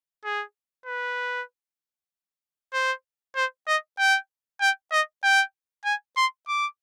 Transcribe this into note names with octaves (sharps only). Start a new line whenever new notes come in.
G#4
B4
C5
C5
D#5
G5
G5
D#5
G5
G#5
C6
D6